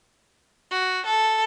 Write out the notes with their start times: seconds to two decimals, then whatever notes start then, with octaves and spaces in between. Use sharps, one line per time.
0.71 F#4
1.05 A4